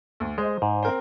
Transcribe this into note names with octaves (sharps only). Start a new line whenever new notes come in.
D2
G#3 C5 D#5
G#2
C4 A#4 C5